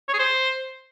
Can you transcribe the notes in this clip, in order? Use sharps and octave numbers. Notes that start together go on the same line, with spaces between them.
C#5
G#4
C5